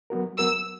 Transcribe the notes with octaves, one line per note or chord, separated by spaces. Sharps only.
F#3 B3 F#4 A#4
F#3 B3 F#4 A#4 E6